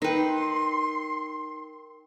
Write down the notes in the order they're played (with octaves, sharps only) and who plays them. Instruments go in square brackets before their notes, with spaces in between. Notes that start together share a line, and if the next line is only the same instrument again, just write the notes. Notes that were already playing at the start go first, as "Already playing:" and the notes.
[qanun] D#4 B4 [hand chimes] A#4 G5 [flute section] C6